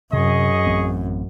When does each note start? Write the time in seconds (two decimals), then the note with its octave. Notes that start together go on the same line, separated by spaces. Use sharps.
0.13 F#2 C3 G#4 D#5 C#6
0.67 A1 C4